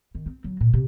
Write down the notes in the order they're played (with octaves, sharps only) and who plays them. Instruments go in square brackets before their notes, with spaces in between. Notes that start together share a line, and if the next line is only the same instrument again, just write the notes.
[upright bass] D#3
C4
F#3
A#2
C3